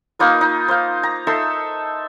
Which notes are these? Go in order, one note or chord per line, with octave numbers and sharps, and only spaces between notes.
A#3 D#4 F4 B4
D#4
C5 F5
A#5
D#4 A4 E5 C6